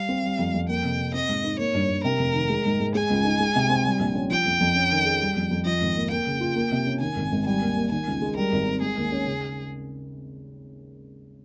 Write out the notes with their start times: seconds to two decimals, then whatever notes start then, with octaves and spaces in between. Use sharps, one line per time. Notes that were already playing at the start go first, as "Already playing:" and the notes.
Already playing: G3 F5
0.09 C4
0.24 G3
0.39 F2
0.54 F2
0.69 A#3 G5
0.84 C3
0.99 C3
1.14 C4 D#5
1.29 G#2
1.44 D#4
1.59 A#3 C#5
1.74 G2
1.89 G2
2.04 C3 A#4
2.19 F1
2.34 D#3
2.49 G#3
2.65 G#2
2.80 G#2
2.95 G#3 G#5
3.10 C#2
3.25 D#4
3.40 G#3
3.56 C3
3.69 C4
3.85 G3
4.00 A#1
4.15 C#4
4.30 F3 G5
4.46 F2
4.61 F2
4.75 C#4
4.91 D#3
5.05 G#4
5.21 G3
5.36 F2
5.51 F2
5.65 F3 D#5
5.81 G#1
5.96 A#3
6.11 A#3 G5
6.26 C#3
6.41 F4
6.56 A#3
6.72 C3
6.86 C#4
7.01 D#3 G#5
7.16 G#1
7.32 G#1
7.46 G3 G#5
7.61 D#2
7.77 A#3
7.91 D#3 G#5
8.07 C#2
8.21 G#3
8.36 G3 A#4
8.52 G#1
8.67 C4
8.82 G#3 G#4
8.97 D#2
9.12 C#4
9.27 C#3